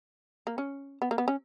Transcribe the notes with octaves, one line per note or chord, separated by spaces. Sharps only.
A#3
C#4
B3
A#3
B3
C#4